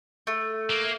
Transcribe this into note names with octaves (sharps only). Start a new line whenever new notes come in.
A3
A#3